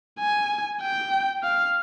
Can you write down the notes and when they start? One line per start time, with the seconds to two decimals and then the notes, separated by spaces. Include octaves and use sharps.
0.19 G#5
0.81 G5
1.43 F5